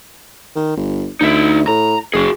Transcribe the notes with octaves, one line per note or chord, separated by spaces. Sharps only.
D#3
G1
D2 D#4 E5
A2 A#5
F#1 F#4 G#4